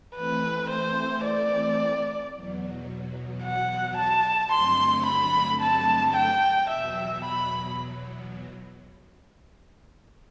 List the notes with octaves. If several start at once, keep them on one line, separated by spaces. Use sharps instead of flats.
E3 A3 C4 B4
C5
D5
E2 B2 F#3
F#5
A5
G2 D3 F#3 A3 C4 C6
B5
A5
G5
E2 B2 F#3 E5
B5